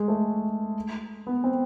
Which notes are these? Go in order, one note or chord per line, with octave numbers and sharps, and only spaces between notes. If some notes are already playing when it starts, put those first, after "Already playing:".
Already playing: G#3
A3
B3
C4